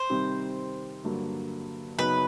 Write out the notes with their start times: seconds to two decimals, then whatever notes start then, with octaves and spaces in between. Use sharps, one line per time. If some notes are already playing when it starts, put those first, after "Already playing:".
Already playing: C5
0.10 C3 D#3 G3 C4
1.04 G2 D3 F#3 A#3
1.98 F#2 C#3 F#3 B3 D#4 B4